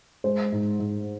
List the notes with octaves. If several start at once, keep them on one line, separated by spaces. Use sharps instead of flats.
G#3 C5
G#2
G#2